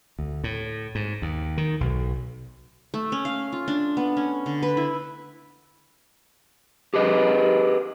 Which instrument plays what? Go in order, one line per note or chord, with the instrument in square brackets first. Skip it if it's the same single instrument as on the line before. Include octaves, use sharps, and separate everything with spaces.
[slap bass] D2
A2
G#2
D#2
D#3
B1
[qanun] A3
C#4
F5
F4
D4
B3
C#4
D3
B4
E4
[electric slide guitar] G4 G#4 B4 D#5